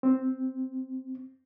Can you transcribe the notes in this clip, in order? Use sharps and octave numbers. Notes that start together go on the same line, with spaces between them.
C4